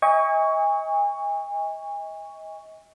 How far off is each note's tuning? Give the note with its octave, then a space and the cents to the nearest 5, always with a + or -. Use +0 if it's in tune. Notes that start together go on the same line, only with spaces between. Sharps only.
D#5 +35 G#5 -35 C#6 +10